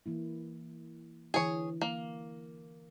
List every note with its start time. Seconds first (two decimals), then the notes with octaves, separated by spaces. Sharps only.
0.06 E3 A#3 E4
1.34 D3 E3 G#4 C#5
1.81 A#3